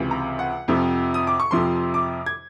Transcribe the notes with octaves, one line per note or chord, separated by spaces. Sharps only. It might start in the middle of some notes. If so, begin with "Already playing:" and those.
Already playing: C#2 C3 E3
A#5
F#5
F2 C3 F3
D#6
D6
C#6
F2 C3 F3 C6
D6
G#6